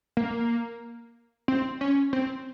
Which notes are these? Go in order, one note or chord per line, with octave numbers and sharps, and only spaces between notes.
A#3
C4
C#4
C4